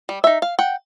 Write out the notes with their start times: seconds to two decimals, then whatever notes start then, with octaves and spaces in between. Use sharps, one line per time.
0.09 G3
0.24 D#4 E5
0.42 F5
0.59 F#5 G5